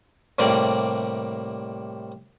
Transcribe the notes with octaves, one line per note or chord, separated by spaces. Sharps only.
A2 C3 G3 A#3 D5